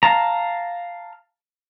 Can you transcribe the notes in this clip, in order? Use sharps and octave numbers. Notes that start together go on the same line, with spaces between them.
F5 A5 A#5